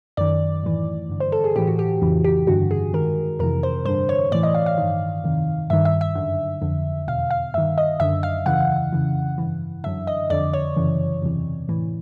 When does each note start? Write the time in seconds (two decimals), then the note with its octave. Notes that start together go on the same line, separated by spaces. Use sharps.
0.17 F#2 D#3 D5
0.64 A2 E3
1.09 G2 D3
1.20 C5
1.32 A4
1.44 G#4
1.56 A2 E3 G4
1.67 F#4
1.79 G4
2.01 F2 C#3 E3
2.24 G4
2.47 G2 D3 F#4
2.71 G#4
2.93 G#2 D#3 A#4
3.39 F2 C3 E3 A#4
3.63 C5
3.85 G2 D3 C5
4.09 C#5
4.32 A2 E3 D5
4.43 D#5
4.54 F5
4.66 F5
4.78 G2 D#3
5.24 F2 C3 D#3
5.70 G2 D#3 E5
5.85 E5
6.01 E5
6.15 F#2 D3
6.62 F2 D3
7.07 E2 B2 F5
7.31 F5
7.54 G2 D#3 E5
7.78 D#5
8.00 F#2 D3 E5
8.23 F5
8.46 E2 C#3 E3 F#5
8.93 F2 C#3 E3
9.38 G2 E3
9.84 F#2 D3 E5
10.07 D#5
10.30 F2 D3 D5
10.53 C#5
10.77 F#2 C#3 E3
11.22 E2 C3 E3
11.68 A2 E3